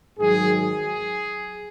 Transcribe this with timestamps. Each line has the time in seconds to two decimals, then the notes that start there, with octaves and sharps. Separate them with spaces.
0.18 G#2 D#3 F#3 G#4
0.55 G#4